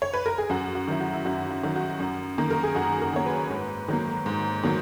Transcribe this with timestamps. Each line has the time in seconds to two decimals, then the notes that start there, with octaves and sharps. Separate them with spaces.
0.02 C#5
0.14 B4
0.26 A#4
0.38 G#4
0.50 F#2 F#4
0.75 F#4
0.87 D#3 F#3 E4
1.00 F#4
1.13 E4
1.25 F#2 F#4
1.51 F#4
1.63 D#3 F#3
1.76 F#4
2.00 F#2
2.38 D#3 A#3
2.50 A#4
2.63 G#4
2.75 F#2 F#4
3.01 A#4
3.13 D#3 A#3 C#5
3.26 B4
3.50 G#2
3.88 D#3 F#3 A#3
4.26 G#2
4.63 D#3 F#3 A#3